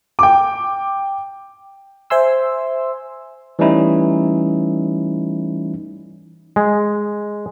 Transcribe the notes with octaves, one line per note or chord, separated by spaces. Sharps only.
G5 D6
C5 E5 G#5 C6 E6
E3 G3 A3 C#4 D#4 E4
G#3